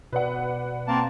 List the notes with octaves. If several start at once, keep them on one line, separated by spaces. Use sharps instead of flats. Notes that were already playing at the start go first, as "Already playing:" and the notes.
B2 B4 D5 F#5
A#3 C4 A5